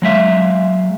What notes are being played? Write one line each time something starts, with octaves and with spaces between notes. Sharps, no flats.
F#3 G#3 E5 F5